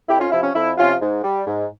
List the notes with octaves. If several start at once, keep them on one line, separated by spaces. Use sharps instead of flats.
F2 E4 G4
C#4 F4
C3 F3 E4
C#4
F2 E4
C3 F3 C#4 F4
G#2
G3
G#2